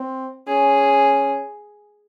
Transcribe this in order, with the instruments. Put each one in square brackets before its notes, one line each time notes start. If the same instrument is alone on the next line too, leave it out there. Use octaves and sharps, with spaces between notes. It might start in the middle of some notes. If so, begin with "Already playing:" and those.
Already playing: [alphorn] C4
[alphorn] C#4 [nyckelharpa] G#4